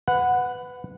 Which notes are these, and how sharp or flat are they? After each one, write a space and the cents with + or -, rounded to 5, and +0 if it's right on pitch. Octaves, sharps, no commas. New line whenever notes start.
B4 +15 F#5 -10